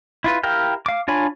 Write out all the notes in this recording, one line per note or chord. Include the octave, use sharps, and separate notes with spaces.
E4 F4 B4
E4 G4 A#4 F5 G5
F5 D6
D4 F4 C#5 G#5 B5